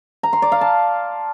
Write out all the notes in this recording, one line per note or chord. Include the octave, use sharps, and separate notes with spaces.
A#5
C6
D5
F5
A5